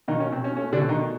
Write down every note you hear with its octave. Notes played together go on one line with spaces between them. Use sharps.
B2 D#3 D#4
C#4
B2 C4
C#4
A3 C#4
D3 D4
B2
D#3 D#4